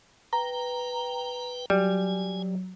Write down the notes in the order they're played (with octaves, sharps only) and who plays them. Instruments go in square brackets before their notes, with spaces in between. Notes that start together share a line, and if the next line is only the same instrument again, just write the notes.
[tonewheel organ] B4 G5 [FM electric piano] A#5
[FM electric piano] F#3 [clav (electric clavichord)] G3 [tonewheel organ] G#5